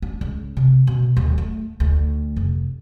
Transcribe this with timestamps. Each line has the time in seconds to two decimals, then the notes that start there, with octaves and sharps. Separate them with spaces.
0.02 D4
0.21 C#2
0.57 C3
0.87 B2
1.17 D1
1.38 A3
1.80 D2
2.36 F1